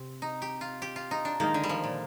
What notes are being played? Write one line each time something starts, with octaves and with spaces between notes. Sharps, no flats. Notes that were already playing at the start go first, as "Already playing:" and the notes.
Already playing: C3 C4
D#4
G4
F4
G4
F4
D#4
D4
D#3 G#3 A#3 D#4
D3
G3
F3
A#2